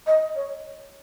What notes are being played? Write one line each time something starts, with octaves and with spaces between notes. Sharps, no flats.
D#5
C#5